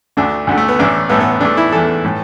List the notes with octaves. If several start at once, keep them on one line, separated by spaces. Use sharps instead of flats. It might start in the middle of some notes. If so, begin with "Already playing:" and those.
D2 D3 A3 D4
D2 D3 A3
A3
B3
A1 A2 A3 D4
A1 A2 A3 B3
B3
E2 E3 A3 D4
E4
E2 E3 A3 A4
A2 E3 A3